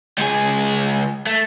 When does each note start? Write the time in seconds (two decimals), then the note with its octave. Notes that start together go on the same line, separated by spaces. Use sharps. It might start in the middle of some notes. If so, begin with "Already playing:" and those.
0.18 C#2 G#4
1.27 A3